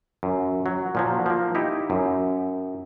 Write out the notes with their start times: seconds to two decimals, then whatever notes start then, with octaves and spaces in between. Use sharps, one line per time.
0.23 F#2
0.66 F#3
0.95 A#2 F3 F#3
1.26 F3 A#3
1.55 D#4 E4 G4
1.90 F#2